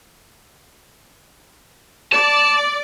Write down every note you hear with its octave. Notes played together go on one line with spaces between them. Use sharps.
D5 A5